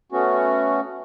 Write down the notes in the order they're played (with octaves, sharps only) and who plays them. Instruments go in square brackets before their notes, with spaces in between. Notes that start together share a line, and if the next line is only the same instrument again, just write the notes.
[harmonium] A3 B3 C#4 F#4